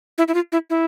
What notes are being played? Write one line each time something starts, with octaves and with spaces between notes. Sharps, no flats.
E4
E4
F4
E4
E4